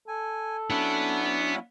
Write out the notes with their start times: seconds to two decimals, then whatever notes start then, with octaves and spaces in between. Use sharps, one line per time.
0.08 A4 G#5
0.70 F#3 B3 C#4 D4 E4 F#5